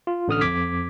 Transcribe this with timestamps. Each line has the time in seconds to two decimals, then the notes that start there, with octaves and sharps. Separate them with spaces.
0.07 F4
0.28 A1 D3 D#6 F6
0.41 F2 D6 G#6 B6